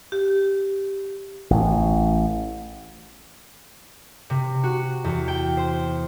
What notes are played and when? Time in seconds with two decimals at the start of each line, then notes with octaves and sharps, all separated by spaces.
0.12 G4
1.50 A1
4.30 C3
4.64 F#4
5.04 E2
5.28 G5
5.57 C5